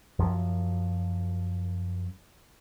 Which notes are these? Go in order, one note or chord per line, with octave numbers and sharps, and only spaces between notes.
F#2 F3 F#3